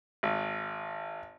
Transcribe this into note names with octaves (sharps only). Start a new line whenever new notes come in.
G#1